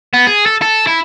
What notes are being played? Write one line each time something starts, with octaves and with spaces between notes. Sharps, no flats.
B3
G#4
A4
A4
E4